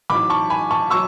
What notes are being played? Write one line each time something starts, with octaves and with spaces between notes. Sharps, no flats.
A1 G#2 F#3 B5 D6
A5 C#6
G#5 B5
A5 C#6
F#3 C#6 E6